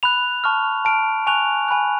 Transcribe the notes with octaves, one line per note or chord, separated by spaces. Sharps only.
B5 F#6 F7
A5 C#6 F6
A5 F6 D7
G#5 C#6 F#6 F7
G#5 B5 F#6